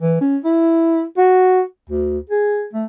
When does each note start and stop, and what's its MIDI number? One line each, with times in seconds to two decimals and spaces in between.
0.01 0.16 52
0.21 0.37 61
0.45 1.04 64
1.18 1.61 66
1.90 2.19 38
2.30 2.67 68
2.73 2.86 57